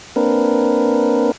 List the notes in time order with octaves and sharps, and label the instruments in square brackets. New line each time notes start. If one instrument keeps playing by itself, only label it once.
[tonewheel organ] A#3 C4 D4 A#4 B4